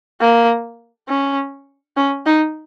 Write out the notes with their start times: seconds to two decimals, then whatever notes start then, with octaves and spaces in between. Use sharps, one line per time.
0.20 A#3
1.08 C#4
1.97 C#4
2.26 D#4